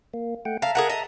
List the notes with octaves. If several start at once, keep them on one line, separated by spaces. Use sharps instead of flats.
A#3
A3 F#5 G5
E5 F5 A5 A#5
G#4 A#4 F#5
D#5